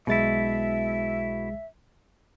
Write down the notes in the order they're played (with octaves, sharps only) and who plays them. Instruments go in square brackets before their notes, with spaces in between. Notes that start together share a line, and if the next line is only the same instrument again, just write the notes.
[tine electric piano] B1 G#3 A6 [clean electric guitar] B2 E4 [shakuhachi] E5